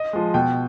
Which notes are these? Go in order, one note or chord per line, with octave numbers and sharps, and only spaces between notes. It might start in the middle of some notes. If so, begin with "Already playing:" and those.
Already playing: D#5
F3 G#3
B2 G5